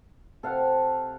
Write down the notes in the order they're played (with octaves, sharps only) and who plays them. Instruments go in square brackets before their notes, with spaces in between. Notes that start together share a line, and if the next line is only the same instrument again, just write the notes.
[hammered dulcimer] C3 [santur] A4 F5 F#5